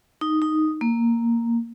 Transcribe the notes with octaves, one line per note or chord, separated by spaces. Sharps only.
D#4
D#4
A#3